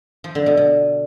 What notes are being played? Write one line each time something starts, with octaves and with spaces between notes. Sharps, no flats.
F3
D3
B2
B2